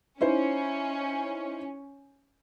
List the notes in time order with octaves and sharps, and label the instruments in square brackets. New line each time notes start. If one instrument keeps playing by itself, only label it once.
[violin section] C#4 [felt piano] D#4 E4 C5